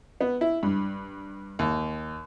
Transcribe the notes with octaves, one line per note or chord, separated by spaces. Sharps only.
B3
E4
G2
D#2